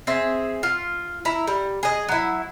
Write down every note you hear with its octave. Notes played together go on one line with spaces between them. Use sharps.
C4 G#4 E5
F4
E4 A#5
G3
G#4 D#5
F#3 E4